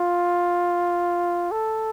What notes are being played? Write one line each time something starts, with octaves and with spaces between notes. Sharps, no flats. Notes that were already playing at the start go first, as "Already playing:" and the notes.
Already playing: F4
A4